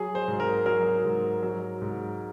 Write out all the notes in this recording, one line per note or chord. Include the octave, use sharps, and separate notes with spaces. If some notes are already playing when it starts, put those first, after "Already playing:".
Already playing: F#3 G#4
C5
G#2
A#4
F#3 A#4
G#2
F#3
G#2